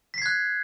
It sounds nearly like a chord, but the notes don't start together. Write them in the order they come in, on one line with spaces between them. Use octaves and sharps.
B6 C7 G#6 F#6